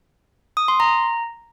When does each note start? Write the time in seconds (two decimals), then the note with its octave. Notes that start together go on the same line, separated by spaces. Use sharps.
0.57 D#6
0.68 C6
0.80 A#5